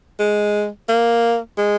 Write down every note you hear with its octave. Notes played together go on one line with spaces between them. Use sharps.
G#3
A#3
G#3